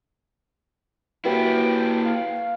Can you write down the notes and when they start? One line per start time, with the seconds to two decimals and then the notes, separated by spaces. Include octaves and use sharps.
1.25 A#3 E4 F#4 G4 B4 G5
2.05 F5